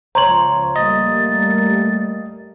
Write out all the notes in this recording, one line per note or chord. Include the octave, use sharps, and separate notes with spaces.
C#2 F3 C5 C#5 A#5 C6 F#7
G3 A3 A#3 D#5 A6